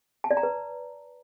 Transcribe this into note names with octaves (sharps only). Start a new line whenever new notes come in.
A5
D5
A#5
B4